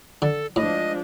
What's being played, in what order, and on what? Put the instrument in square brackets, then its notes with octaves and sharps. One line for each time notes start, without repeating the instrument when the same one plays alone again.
[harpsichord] D3 [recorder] A4
[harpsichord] A2 [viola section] F3 G#3 D4 [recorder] D#5